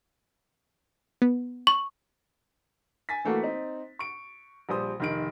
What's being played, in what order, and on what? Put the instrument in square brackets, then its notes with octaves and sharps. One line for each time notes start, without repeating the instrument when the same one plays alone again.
[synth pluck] B3
[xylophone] C#6
[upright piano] G#5 A6 B6
E3 A3 A#3 F#4 A4
C4 D#4
C#6 D7
A#1 G3 C5 D#6
F1 D#3 D7